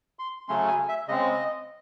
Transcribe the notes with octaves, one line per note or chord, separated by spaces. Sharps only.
C6
C#3 F#3 A3 C#4 C6
G#5
E5
C#3 G#3 C4 D#5